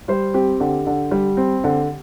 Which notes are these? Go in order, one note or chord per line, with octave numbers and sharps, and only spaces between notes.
G3 C5
C4 G4
D3 G4
D3
G3
C4
D3